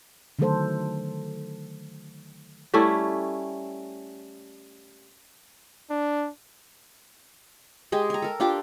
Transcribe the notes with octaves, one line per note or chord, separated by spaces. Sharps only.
D3 D#3 F#3 A3 A4 C5
G3 A3 C#4 E4
D4
G#3 G4 G#4
G#5 A#5
A4 A#4
D4 F4 G4 D6